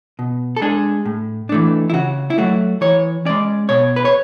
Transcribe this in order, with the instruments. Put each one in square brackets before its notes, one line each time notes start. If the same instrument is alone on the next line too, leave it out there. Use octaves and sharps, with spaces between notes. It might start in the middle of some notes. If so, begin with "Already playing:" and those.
[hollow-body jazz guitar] B2
A4
G#3 D4 G#4
A2
E3 A3 D4
E4
C#3 F#4
E4
F#3 A3 F#4
E3 C#5
G#3 C#4 D5
B2 C#5
B4
C#5